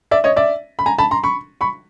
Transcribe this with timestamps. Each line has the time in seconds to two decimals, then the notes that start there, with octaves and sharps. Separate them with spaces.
0.11 D5 E5
0.24 C#5 D#5
0.36 D5 E5
0.79 B5
0.86 G#5 A#5
0.98 A5 B5
1.11 A#5 C6
1.23 B5 C#6
1.61 B5 C#6